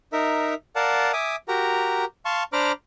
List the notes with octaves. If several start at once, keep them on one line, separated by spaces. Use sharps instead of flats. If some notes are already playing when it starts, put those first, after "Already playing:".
D#4 A#4 E5
A#4 D5 F5 F#5 A5
E5 G#5 D6 D#6
F#4 G4 A#4 A#5
F5 A5 C6 C#6
D4 C5 A#5 B5 D6 F6